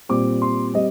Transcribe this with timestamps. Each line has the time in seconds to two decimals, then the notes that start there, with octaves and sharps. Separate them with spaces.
0.09 A#2 G3 C4 D6
0.42 C6
0.74 G3 C4 D#5